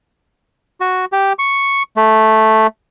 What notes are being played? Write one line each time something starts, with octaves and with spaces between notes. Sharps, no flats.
F#4
G4
C#6
A3